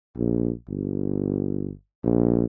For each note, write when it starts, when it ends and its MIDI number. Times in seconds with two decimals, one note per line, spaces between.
0.17 0.50 34
0.68 1.71 31
2.04 2.45 34